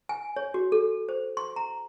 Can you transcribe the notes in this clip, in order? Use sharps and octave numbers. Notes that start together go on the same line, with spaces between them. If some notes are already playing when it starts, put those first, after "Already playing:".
G#5
C#5
F#4
A4
C5
C6
A#5